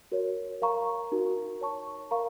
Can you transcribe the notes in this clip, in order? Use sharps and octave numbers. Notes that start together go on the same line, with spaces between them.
F#4 A#4 C#5
A#4 F5 A#5 C#6
D#4 F#4 A#4
C#5 A5 C#6
A#4 F5 A#5 C#6